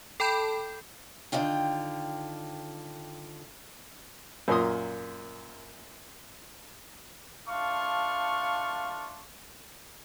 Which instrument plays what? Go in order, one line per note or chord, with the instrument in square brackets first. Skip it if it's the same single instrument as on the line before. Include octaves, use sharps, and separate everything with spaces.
[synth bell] A4 G5 A5 B5 G6
[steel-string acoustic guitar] D3 D#3 F4 G5
[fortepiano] F#2 A#2 A#3 F4 C6 D#6
[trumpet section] A3 D4 F4 F5 C#6